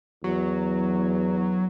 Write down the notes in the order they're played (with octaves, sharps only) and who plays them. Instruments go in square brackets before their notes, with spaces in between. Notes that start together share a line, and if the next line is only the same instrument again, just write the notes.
[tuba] E2 [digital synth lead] F#3